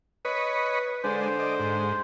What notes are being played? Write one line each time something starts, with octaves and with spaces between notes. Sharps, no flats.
B4 C#5 D#5 B5
D3 G#3 D4 C5
D5 D#5
G#2